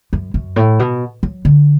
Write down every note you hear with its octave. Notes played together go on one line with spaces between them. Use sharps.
F#2
F#2
A2
B2
F#3
D3